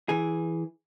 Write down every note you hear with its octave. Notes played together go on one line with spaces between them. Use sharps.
E3 G#4